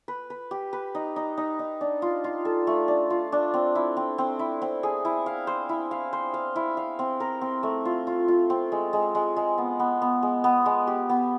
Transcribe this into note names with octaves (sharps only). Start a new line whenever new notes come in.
B4
B4
G4
B4
D#4
D#4
D#4
D#4
D4
F4
F4
A4
A3
D4
F4
D4
C4
E4
C4
C4
E4
C4
G#4
E4
F5
C5
E4
F5
C5
F5
E4
F5
C4
A#4
C4
A3
F4
F4
F4
C4
G#3
G#3
G#3
G#3
B3
B3
B3
G#3
B3
G#3
G4
B3